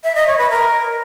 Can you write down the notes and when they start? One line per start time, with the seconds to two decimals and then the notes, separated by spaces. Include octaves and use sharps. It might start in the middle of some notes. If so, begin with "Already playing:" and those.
0.04 E5
0.15 D#5
0.27 C#5
0.38 B4
0.50 A#4